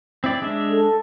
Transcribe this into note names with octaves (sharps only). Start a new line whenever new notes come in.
C4 E4 D5
G#3 D4 E5
A4